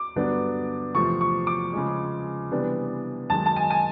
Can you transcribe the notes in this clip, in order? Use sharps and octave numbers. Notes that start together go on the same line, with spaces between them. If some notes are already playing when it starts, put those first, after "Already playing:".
Already playing: D6
G2 D3 F#3 B3 D4
E2 C3 F3 A3 C#6
C#6
D6
C#3 F3 G#3
C3 E3 G3 B3 D4
F#2 D#3 G#3 A5
A5
G#5
G#5